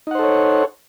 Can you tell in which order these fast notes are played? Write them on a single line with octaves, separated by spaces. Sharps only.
D#4 F#5 C5 A4 C#5